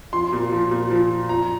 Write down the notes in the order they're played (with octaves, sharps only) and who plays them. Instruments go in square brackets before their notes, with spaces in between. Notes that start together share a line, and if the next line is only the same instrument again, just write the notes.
[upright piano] F3 C6
A#2
F3
A#2
F3
F3
F3 A#5